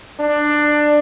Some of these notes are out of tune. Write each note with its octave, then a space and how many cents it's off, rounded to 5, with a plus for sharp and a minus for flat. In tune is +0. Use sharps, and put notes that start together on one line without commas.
D4 +15